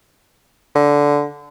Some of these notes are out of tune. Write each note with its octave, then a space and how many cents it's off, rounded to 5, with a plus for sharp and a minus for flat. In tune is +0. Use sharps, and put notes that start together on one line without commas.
D3 -10